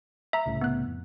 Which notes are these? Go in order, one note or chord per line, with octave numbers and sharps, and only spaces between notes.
E5 A#5
C2 A2 C#3
B3 F#6
F2